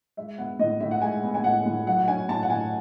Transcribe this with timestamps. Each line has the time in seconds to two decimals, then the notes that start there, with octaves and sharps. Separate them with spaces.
0.17 G#3 E5
0.38 B3 F#5
0.59 A2 D#5
0.80 A2 E5
0.91 F#5
1.01 G#3 G#5
1.23 B3
1.34 G#5
1.44 A2 F#5
1.66 A2
1.86 F#3 F#5
1.98 F#5
2.08 C#4 G#5
2.29 A2 A5
2.43 F#5
2.50 A2 G#5